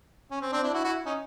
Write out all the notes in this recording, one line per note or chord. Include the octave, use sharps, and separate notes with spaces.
C#4
C4
C4 D4
D4 E4
E4 F#4
E4 F#4
C#4 D#4